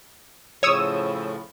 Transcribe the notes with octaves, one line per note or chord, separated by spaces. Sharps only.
A2 C#3 F3 C#5 D#6 E6